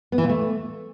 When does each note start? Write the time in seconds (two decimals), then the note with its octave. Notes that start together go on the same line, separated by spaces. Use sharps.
0.12 B3
0.18 E3
0.24 A#2
0.29 A3